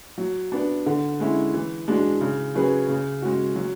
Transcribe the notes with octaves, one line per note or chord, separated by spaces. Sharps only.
F#3
B3 D4
D3
G#3 C#4 E4
E3
G#3 D4 F#4
C#3
F#3 C#4 G#4 B4
C#3
G#3 C#4 F#4
F#3